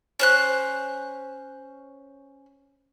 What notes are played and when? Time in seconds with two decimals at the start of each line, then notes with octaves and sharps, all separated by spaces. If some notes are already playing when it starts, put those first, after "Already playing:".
0.19 C#4 C5 F#6